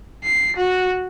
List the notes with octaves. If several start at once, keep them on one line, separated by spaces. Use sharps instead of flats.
C7
F#4